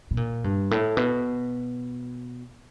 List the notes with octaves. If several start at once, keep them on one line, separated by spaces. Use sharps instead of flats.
B2
A#2
G2
A2
B2